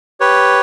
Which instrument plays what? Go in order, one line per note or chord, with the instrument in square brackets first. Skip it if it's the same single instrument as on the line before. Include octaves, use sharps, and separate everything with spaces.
[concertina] G4 B4 C#5